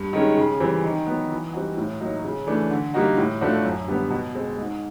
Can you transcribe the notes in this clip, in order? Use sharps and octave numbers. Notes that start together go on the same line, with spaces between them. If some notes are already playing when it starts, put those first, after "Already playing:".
Already playing: G2
D#3 G#3 C#4
C#3
E3 G3 C4
D#3
F#3 B3
E3
G3 C4 D#4 F#4
A2
F#3 A#3 D#4 F#4
C#3
E3 A3 D4
D3
G3 A#3 D#4 F#4
A2
F3 A3 D4 F#4
F#2
D3 G3 B3
B2
G#3 C4
G#2